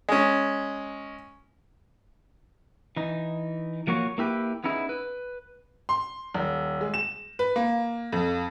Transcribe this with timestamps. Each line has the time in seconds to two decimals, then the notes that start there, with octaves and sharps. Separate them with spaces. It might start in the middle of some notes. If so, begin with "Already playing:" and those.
0.09 G#3 C#4
2.97 E3 D#4
3.87 F3 A#3 F#4 C#5
4.18 A#3 E4 G4 B4
4.64 B3 C#4 D#4 E4 G#4
4.89 B4
5.89 C6
6.34 D#1
6.81 G#3
6.94 E7
7.39 B4
7.56 A#3
8.12 F2